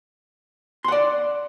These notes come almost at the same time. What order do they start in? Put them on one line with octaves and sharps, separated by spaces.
C6 F#5 D5